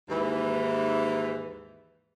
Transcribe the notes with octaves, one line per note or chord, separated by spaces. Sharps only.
D#2 G#2 E3